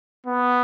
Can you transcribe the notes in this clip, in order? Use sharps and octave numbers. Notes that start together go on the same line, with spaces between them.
B3